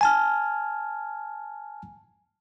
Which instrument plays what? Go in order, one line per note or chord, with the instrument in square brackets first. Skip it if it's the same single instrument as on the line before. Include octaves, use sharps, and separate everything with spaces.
[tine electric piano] G#5 A5 F6